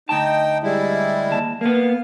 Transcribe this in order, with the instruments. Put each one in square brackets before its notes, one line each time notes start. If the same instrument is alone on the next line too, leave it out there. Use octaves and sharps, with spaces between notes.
[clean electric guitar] D2 A5 [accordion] D#4 G5
[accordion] G3 G#3 E4
[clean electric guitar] D#2 A5
[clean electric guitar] A#3 B3 [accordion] F5